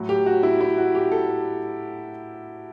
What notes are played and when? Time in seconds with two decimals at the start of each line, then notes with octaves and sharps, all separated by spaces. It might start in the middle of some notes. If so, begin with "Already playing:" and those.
Already playing: A2 F#3
0.09 G4
0.26 F#4
0.43 E4
0.61 E4
0.78 F#4
0.95 G4
1.12 A4